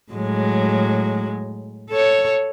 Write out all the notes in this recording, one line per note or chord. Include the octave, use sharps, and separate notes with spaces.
A2 F#3 G#3
A4 C#5